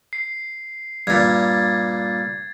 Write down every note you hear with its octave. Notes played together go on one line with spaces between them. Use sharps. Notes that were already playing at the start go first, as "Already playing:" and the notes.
C7
G2 A#2 G#6 A6